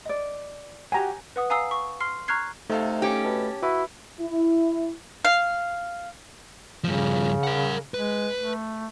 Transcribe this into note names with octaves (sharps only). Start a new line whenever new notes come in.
D5 D#5
F#4 G4 F#5 G#5 A#5
B4 F#5 D#6
F5 G#5 A#5 D#6 E6 C7
C#6
C6 F6 C7
A#5 C#6 F6 F#6 G#6 C7
C3 A3 D#4 A4 F5
C#4 G4
B2 A5
E4 F#4 B4
E4
F5
G2 C#3 F3
A#4 F#5
G#3 B4
A3